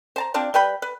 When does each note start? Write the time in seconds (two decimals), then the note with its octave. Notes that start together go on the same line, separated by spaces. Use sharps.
0.16 C5 A5 A#5
0.34 C4 D4 F4 D5
0.54 G3 B4 G5 B5
0.82 B4